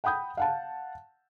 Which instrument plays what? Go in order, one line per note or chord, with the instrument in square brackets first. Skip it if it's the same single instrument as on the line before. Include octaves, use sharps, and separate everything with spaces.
[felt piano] F#5 G5 B5 D#6 G6
F5 F#5 A5